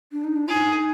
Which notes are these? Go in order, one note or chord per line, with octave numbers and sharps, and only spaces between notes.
D4
D#4
D4
D#4 F4 G#4